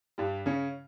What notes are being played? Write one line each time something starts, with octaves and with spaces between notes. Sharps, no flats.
G2 G3
C#3 C#4